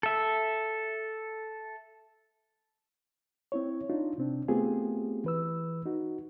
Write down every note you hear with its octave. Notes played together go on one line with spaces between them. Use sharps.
A4 E5
C4 E4 C#5
D4 D#4 F4
C3 C4 D4
A3 B3 C4 F4 G4 G#4
E3 B4 E6
D#4 F#4